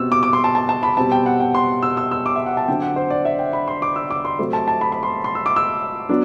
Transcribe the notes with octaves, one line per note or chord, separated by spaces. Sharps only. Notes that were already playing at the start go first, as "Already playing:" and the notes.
Already playing: B2 G3 C4 E6
D6
D6
C6
A5
A5
A5
B5
B2 G3 C4 A5
G5
F#5
G5
C6
E6
E6
E6
D6
E5
F#5
A5
D3 F#3 C4 G5
F#5
C5
D5
E5
G5
B5
C6
D6
E6
D6
C6
C3 F#3 A3 C4
A5
A5
B5
B5
C6
C6
E6
D6
E6
F#3 B3 D4